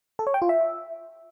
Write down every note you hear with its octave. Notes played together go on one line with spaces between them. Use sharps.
A4
C#5
G5
F4
E5